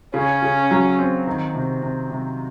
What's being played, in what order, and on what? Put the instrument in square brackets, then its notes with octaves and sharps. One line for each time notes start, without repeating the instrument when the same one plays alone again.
[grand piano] C#3 [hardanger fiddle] C#4
[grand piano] C#3
F#3
C4
D#3
C3
C3
C3